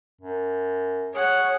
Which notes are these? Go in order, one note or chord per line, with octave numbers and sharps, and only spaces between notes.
F#2
G#4 C#5 F#5